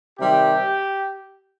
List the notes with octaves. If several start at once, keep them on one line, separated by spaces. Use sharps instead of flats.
C3 D#3 G3 G4